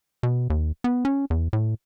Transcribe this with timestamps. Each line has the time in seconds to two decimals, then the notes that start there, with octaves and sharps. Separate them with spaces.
0.23 B2
0.50 D#2
0.84 B3
1.05 C#4
1.30 E2
1.53 A2